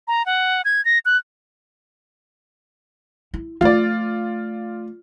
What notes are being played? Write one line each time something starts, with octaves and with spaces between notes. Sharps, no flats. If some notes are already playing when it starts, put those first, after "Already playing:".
A#5
F#5
G#6
A#6
F#6
E4
F3 A3 F4 D5